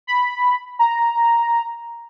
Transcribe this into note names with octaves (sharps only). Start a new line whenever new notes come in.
B5
A#5